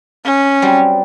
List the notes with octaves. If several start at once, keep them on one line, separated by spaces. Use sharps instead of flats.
C#4
F#3 G3 C4